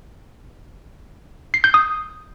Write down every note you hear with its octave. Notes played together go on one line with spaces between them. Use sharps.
C7
G6
D#6